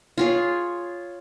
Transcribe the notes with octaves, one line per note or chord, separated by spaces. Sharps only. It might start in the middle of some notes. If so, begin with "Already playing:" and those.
F4 G#4 C#5